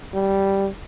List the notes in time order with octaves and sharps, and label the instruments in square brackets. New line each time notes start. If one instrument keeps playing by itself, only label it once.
[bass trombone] G3